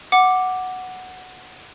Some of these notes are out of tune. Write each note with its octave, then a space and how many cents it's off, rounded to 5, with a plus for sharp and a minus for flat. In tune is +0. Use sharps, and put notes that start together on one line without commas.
F#5 +0 D6 +0